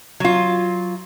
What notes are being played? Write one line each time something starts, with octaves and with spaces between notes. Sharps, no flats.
F#3 F4